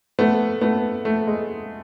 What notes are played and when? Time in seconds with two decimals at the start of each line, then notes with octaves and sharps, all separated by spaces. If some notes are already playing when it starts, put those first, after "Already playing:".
0.19 A3 B3
0.61 A3 B3
1.05 A3
1.27 G#3